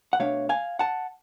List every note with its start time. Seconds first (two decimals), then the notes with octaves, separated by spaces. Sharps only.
0.13 F#5
0.19 B2 A3 D4 C#5 F5
0.49 F5 G#5
0.79 F#5 A5